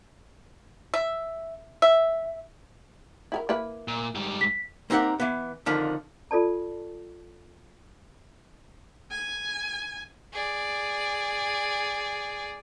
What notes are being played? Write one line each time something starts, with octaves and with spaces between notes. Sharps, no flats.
E5
E5
E4 G#4 A#4
A#3 E4 B4
A#2
G#2 G3
B6
A#3 C4 D#4 G4 A#4 F#5
E3 B3
F2 D3 D#3 F3
F4 A4 D5 A5
G#5
G#4 D5